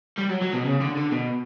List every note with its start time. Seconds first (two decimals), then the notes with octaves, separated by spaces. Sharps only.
0.18 G3
0.29 F#3
0.41 F#3
0.53 B2
0.65 C#3
0.81 D3
0.97 D3
1.12 B2